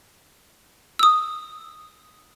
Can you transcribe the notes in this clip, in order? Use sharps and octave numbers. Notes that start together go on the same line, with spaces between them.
D#6 E6